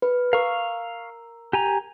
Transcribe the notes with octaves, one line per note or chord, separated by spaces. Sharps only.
B4
A#4 F5 C#6
G4 G#5 A#5